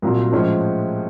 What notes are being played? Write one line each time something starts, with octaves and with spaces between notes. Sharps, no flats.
C2 A#2 F#3
A2 F3 G#3 C#4